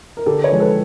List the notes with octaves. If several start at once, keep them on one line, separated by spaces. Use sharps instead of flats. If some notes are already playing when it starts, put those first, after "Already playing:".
A#4
D3 G4 A4
B4 C#5
F3 G#3
A4 B4